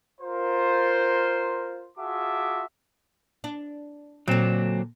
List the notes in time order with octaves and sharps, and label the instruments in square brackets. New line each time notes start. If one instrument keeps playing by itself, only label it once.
[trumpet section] F4 A#4 C5
F4 F#4 G#4 E5 A5 D6
[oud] D4
[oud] A#2 D3 [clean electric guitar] F#3 C4